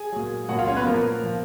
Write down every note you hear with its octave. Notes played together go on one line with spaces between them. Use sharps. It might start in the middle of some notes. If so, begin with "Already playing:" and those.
Already playing: G#4 G#5
A#2 F#3
A#2 F#3 F#4 F#5
F4 F5
C#4 C#5
B3 B4
A#2 F3 A#3 A#4
A#2 F3